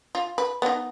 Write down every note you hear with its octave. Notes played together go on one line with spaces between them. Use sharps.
F4
B4
B3 D#4